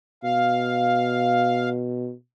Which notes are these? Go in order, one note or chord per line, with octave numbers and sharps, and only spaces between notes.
B2 F5